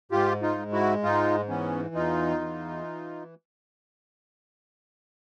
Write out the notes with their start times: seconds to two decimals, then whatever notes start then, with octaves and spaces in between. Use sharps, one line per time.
0.12 G#2 F4 G4
0.42 D#4 F4
0.58 G#3
0.73 E4 F#4
1.03 G#2 D#4 F4
1.49 E3 B3 C#4
1.95 E2 D#4 F4
2.41 E3